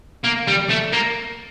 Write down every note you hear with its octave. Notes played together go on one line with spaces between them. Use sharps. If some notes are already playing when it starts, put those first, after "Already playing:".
A#3
G3
A3
A#3